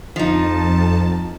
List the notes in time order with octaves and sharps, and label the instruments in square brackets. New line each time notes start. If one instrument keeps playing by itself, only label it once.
[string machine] F2 A5 [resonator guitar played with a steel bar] F3 D#4